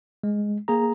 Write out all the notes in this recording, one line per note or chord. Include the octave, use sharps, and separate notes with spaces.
G#3
A#3 G#4 A#5